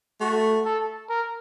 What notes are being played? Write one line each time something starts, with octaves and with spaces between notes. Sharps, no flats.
A3 F#4
A4
A#4